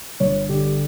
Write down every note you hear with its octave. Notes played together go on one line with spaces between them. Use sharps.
G1 C#5
D3 G4